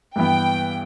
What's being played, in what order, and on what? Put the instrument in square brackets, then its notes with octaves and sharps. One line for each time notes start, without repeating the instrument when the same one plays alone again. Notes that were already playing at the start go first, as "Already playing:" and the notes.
[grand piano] G2 E3 B3 [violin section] G5